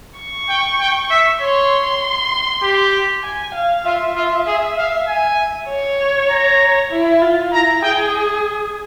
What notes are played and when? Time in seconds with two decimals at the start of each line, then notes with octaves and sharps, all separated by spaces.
0.18 C#6
0.49 G5
0.79 G5
1.10 E5
1.40 C#5 C6
2.62 G4
3.23 G#5
3.55 F5
3.85 F4 E5
4.15 F4
4.47 G#4
4.77 F5
5.08 G#5
5.69 C#5
6.30 A#5
6.91 E4
7.21 F4
7.53 E4 A#5
7.82 G#4 G5